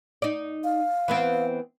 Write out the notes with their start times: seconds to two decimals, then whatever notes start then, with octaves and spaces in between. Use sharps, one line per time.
0.22 D#4 D5
0.64 F5
1.08 E3 B3 C4